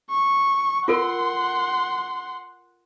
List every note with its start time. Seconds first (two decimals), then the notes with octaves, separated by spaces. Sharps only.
0.10 C#6
0.88 F4 A4 A#4 F#5 C6